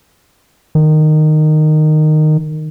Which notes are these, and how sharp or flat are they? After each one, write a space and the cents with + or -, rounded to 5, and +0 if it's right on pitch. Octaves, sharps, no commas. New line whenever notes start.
D#3 -15